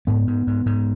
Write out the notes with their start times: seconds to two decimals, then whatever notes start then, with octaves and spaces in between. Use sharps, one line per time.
0.07 G#2 B3
0.27 G#2
0.47 G#2
0.66 G#2